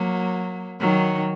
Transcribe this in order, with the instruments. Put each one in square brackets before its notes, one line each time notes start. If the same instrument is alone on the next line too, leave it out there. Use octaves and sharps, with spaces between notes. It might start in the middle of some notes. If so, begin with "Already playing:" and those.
Already playing: [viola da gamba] F#3 A#3
D#3 F#3